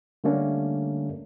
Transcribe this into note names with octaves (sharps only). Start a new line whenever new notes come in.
D3 G3 A3 A#3 C#4 D4